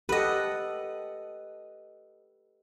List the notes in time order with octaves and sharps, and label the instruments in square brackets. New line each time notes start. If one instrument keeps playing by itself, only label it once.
[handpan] G4 A4 F#5 [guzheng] B4 D#5